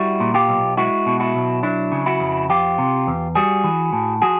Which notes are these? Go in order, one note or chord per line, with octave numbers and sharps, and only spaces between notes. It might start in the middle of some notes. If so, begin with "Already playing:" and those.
Already playing: G3 E4 F#4
A#2
F4 G4
B1
G#3 E4 F#4
B2
E4 F#4
B1
F#3 D4 E4
C#3
E4 F#4
F2
F3 F4 G4
C3
E2
G3 F#4 G#4
E3
A2
F3 F#4 G#4